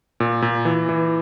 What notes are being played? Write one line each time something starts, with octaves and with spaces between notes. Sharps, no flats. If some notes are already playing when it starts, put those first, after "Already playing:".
A#2
A#2
E3
E3